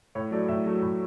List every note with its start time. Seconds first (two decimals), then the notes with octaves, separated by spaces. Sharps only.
0.15 A2 C#5
0.31 F#3 A3 D5
0.48 A2 E5
0.66 F#3 A3
0.82 A2